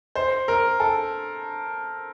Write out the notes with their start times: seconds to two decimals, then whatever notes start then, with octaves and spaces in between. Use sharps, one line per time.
0.15 C5
0.48 A#4
0.80 A4